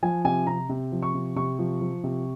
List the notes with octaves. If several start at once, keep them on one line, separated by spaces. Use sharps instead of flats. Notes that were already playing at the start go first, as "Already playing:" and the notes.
F3 G#5
C3 G#5
C3 A#5
C3
F3
C#6
C3
C3 C#6
F3
F3
C3